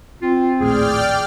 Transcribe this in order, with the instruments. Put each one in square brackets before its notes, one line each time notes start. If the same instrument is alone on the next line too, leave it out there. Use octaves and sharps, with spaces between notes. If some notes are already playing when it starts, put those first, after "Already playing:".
[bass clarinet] C4 [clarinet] F4
[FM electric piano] A#1 D#2 A2 [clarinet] G#4 [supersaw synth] D5 G5 F6